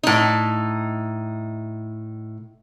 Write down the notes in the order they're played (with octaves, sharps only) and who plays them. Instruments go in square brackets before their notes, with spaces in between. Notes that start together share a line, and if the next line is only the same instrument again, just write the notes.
[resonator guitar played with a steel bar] A2 D#4